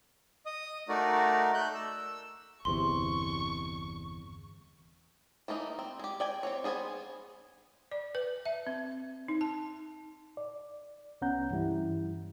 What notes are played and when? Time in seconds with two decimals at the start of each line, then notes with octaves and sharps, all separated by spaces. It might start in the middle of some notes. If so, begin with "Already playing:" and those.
0.46 D#5 D#6
0.89 A3 D#4 F#4 A#4 D5
1.54 A3 F#6 G6
1.74 E6
2.65 G1 E2 C3 C6 C#6
5.48 E3 A3 A#3 D#4
5.79 C4
5.99 G#3 G4
6.20 D5 G5 G#5
6.43 C4 F#4 C#5
6.64 B3 G#4 C5 F5 G#5
7.92 D5
8.15 B4
8.45 E5
8.67 C4
9.28 D#4
9.41 A5
10.37 D5
11.21 C2 B3 C#4 F#5 A#5 G6
11.51 G2 E3 G3 E4